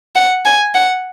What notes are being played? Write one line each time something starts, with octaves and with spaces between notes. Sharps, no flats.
F#5
G#5
F#5